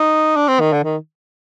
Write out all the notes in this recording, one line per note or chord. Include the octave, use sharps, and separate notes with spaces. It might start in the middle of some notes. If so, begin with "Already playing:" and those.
Already playing: D#4
D4
C4
D#3
D3
D#3